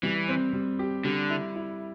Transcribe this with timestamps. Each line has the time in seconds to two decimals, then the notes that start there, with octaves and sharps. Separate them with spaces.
0.03 E3 G3
0.28 C4
0.53 G3
0.79 G4
1.05 D3 G3
1.30 E4
1.56 E4